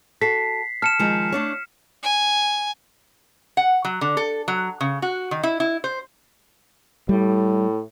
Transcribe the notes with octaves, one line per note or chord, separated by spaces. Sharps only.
F#4 A4 B6 C7
A5 F6 C#7 E7
D#3 F3 G#3
A3 D4 C#5
G#5
F#5
F#3
D3
A4
F#3
C#3
F#4
D#3
E4
E4
C5
A2 G3